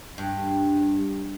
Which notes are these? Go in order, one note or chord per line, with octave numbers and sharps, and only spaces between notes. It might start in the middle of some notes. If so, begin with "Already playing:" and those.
G2